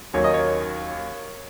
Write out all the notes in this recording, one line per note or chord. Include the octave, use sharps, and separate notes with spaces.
D#2 D#3 F#3 A#3 C#4 C#5
D#5
C#5